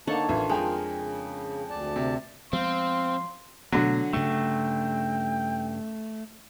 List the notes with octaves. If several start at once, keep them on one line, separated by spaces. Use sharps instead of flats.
D3 A#3 D4 D#4 A4 C#5 A5
A1 D#3 F4
F2 G#3 A#4 G5 G#5
C#3
D2 D5 A5
C3
F3 G#3 B3 C4 F5 C6
B2 D3 F#3 A3 B3
G2 C#3 A3 G5